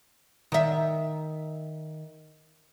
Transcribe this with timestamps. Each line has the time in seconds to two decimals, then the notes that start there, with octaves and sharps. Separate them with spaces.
0.52 D#3 E5